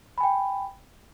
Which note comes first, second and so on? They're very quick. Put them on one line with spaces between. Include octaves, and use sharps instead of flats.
B5 G#5 G5